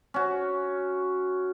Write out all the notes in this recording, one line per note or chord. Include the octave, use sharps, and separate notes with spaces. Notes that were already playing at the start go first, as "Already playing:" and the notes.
C#4 F#4